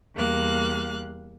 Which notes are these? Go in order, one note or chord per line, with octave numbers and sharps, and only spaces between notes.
E2 G3 A#3 F5 F#6